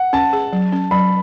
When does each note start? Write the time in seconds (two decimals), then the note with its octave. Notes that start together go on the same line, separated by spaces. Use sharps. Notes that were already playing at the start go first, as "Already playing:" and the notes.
Already playing: F#5
0.13 C#4 A5
0.33 G#4
0.53 F#3
0.73 C#4
0.91 F#3 B5